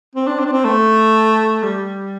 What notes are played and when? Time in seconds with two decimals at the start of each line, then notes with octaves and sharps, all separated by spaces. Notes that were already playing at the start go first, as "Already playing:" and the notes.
0.15 C4
0.27 D4
0.40 C4
0.46 D4
0.52 C4
0.65 A3
1.63 G3